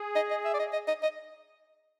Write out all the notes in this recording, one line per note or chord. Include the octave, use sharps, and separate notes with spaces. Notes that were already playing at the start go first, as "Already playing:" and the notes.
Already playing: G#4
D#5
D#5
E5
D5
D#5
D#5
D#5
D#5